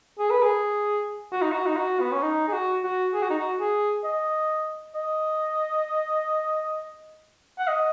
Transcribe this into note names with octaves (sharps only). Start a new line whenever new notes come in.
G#4
B4
G#4
F#4
D#4
F#4
D#4
F#4
B3
C#4
D#4
G#4
F#4
F#4
G#4
F#4
D#4
F#4
G#4
D#5
D#5
F#5
D#5